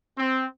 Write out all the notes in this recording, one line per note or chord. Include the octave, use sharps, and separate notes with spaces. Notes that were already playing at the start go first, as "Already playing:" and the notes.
C4